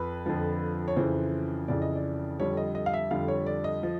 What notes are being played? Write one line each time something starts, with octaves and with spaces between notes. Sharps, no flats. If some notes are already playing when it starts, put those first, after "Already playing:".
Already playing: F2 B4
F2 D3 F3
C#5
F2 C#3 E3 C5
F2 C#3 E3 D5
D#5
D5
F2 D3 G3 C#5
D#5
D#5
F5
E5
F2 D3 G3 F5
C#5
D5
D#5
F3